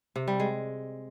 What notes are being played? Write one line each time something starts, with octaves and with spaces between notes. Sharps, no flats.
C3
G3
G#3